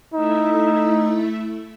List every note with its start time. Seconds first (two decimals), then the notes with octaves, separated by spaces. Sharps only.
0.14 A3 D#4 E4 E5